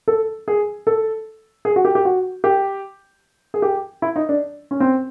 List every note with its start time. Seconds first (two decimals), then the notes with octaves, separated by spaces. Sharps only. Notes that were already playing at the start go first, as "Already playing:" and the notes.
0.08 A4
0.48 G#4
0.87 A4
1.65 G#4
1.76 F#4
1.85 G4
1.95 G4
2.05 F#4
2.44 G4
3.54 G#4
3.62 G4
4.02 E4
4.16 D#4
4.29 D4
4.71 C#4
4.80 C4